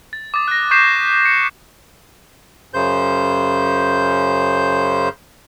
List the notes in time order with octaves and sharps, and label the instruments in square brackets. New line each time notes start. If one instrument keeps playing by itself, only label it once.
[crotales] A6
D6 D#6 A6
F#6 A#6
C#6 G6 B6 C7 E7
C#7
[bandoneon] F#2 C#3 C5 G6